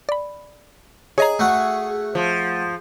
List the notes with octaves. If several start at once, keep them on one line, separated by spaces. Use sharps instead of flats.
D5 B5
G#4 C#5 D#5 A#5
A3 F#4
F3